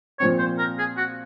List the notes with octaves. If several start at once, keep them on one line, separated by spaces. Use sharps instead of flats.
A#2 F3 C4 C#5
C5
A#4
G#4
F#4